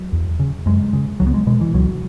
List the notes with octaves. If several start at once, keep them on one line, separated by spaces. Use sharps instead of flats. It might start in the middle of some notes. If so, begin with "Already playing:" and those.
Already playing: F#3
E2
C#3
F#2 G#3
C#3
C#2 F#3
B3
G#3
B2 G#3
E3
C#2 F#3